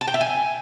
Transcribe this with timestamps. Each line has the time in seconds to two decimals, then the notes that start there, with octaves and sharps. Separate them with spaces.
0.01 A5
0.08 G5
0.14 E5
0.21 G#5